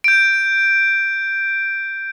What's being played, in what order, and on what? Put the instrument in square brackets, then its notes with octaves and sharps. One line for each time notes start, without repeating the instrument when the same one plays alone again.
[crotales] G6 D7